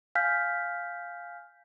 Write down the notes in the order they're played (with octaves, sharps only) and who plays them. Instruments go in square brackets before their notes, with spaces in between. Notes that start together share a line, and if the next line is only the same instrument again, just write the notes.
[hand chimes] F5 G#5 F6 G6 B6